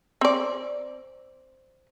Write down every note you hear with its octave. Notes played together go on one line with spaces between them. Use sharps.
C4 D5